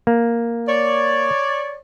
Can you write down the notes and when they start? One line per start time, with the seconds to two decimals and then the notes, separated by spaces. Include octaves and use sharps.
0.07 A#3
0.68 C#5 D5